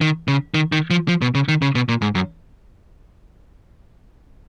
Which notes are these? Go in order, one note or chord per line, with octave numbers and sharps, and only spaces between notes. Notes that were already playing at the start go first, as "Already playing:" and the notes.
D#3
C#3
D#3
D#3
F3
F3
B2
C#3
D#3
C#3
B2
A#2
G#2
F#2